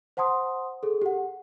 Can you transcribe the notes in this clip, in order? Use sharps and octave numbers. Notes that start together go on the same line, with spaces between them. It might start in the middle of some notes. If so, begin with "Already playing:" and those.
C5 F#5 A5 C6 D#6
G#4 A4
G4 F#5